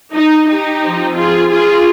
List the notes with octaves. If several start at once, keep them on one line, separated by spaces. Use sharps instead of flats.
D#4
D#4 G4
F3 C4
F4 G#4
F4 G#4